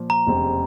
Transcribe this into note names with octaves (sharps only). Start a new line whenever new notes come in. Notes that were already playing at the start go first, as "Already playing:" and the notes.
Already playing: A#2 F3
A#5
F1 E2 C#3 G3 C4